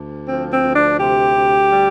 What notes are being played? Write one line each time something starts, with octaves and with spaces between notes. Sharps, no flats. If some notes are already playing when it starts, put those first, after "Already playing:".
Already playing: D2
F3 C4
C4
D2
D4
C3 G4
D2
G3